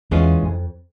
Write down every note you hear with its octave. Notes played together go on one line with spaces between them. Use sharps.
E2 E3 G#3 C#4 F4
F2